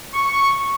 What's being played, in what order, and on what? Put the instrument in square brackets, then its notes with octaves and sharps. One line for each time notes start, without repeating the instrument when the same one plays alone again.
[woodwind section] C#6